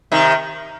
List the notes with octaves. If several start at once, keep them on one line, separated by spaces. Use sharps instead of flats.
C3 D#3